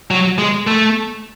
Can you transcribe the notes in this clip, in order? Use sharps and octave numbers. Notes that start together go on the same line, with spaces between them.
F#3
G#3
A3